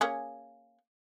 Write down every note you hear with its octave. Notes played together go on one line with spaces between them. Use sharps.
A#3 C#4 G#4